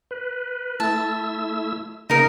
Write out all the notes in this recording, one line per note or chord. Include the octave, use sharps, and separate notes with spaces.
B4
A3 E4 A5 E6
C#3 A#3 D#4 A#4 D#5